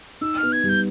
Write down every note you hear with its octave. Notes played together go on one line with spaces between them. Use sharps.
D#4 E6
F6
B3
G#6
G3
G6